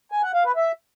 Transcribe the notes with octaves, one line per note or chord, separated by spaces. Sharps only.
G#5
F#5
F5
B4
E5